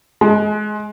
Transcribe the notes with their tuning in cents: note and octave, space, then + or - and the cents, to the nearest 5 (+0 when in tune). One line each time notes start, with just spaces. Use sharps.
G#3 +25